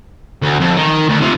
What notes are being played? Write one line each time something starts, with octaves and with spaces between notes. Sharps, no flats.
D2
F2
D#3
D2
C3 F3